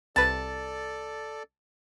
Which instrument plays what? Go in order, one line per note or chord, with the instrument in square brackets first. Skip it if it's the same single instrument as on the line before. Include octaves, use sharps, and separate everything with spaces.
[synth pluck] C2 B4 [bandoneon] A4 D5 [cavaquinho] A5